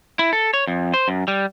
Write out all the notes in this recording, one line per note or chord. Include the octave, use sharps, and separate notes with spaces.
E4
A4
C#5
F2
C5
F#2
G3